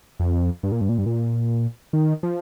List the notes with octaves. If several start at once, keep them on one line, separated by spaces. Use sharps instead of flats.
F2
G2
A#2
G2
A#2
G2
A#2
D#3
F3